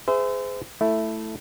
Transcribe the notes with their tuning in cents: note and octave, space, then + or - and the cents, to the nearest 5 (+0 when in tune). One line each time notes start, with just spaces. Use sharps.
G#4 +0 C5 -40 E5 +0
A3 +0 E4 +0